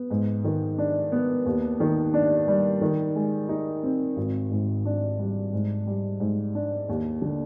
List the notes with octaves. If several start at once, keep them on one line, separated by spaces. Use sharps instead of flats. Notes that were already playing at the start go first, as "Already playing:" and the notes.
Already playing: B3
G#2
D#3
D4
B3
D#2
D#3
D4
G3
D#3
G#3
D#4
C4
G#1
G#2
D4
G3
G#2
G3
G#2
D4
D#2
D3